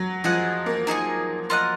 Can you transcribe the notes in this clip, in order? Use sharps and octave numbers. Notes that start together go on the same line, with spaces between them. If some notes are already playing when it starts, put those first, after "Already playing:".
Already playing: F#3
F3 G#4 D#5 F#5
A#3
D#4 G#4 D#5 G#5
F4 A#4 D#5 F#5